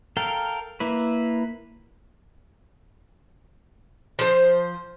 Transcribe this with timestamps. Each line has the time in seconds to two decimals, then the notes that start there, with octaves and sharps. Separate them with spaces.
0.17 A4 A#4 F5 G5
0.80 A#3 E4 B4
4.19 F3 C5